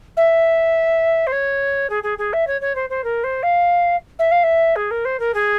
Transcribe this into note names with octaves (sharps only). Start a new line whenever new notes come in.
E5
C5
C#5
G#4
G#4
G#4
E5
C#5
C#5
C5
C5
A#4
C5
F5
E5
F5
E5
G#4
A#4
C5
A#4
G#4